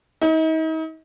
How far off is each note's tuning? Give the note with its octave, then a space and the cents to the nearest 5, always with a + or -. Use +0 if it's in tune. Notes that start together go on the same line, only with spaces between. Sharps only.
D#4 +40